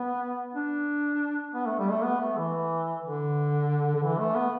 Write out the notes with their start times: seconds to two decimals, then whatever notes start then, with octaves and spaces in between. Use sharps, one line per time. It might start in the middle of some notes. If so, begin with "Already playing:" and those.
Already playing: B3
0.55 D4
1.54 B3
1.67 A3
1.79 G3
1.91 A3
2.04 B3
2.21 A3
2.38 E3
3.03 D3
3.96 D3
4.03 E3
4.19 A3
4.36 B3